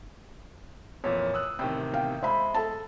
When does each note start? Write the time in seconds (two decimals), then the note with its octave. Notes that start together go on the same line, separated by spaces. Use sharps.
1.04 F2 A#2 E3 C#5
1.34 D#6 E6 F#6
1.59 A1 C3 D#3 G5
1.94 F5 G5
2.23 G#3 C5 E5 B5
2.54 A4 A5